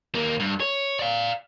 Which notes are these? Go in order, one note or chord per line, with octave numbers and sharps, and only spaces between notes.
D#2 A#3
G2
C#5
D5 F5